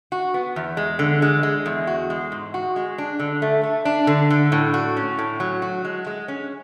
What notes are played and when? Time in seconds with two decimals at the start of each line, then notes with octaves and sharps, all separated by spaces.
0.12 F#4
0.34 B3
0.56 E2
0.77 G#3
0.99 D3
1.22 G#3
1.43 G#3
1.66 E2
1.87 F#4
2.10 G#3
2.32 G#2
2.54 F#4
2.76 G#3
2.98 D4
3.19 D3
3.42 A3
3.63 A3
3.85 D4
4.07 D3
4.30 D3
4.52 A2
4.74 F#4
4.97 C#4
5.18 A2
5.40 F#3
5.62 F#4
5.85 G#3
6.06 G#3
6.28 C#4